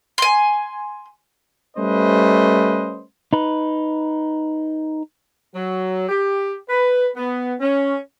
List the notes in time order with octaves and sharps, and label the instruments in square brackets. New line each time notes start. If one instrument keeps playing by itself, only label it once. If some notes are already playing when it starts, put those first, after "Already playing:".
[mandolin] G#5 C6
[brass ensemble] G3 A3 C#4 B4 C5 D#5
[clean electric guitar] D#4 B4
[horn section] F#3
G4
B4
B3
C#4